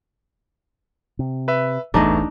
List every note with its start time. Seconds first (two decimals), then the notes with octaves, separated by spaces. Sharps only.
1.19 C3
1.48 B4 E5
1.94 D1 A1 E2 E3 A3 D4 D#4 D#5